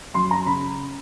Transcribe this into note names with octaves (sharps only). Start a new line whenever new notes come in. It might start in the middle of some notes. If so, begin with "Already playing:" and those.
F#2 C6
A#5
C#3 B5